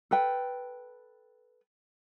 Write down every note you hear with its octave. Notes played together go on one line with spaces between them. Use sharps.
A4 B4 G5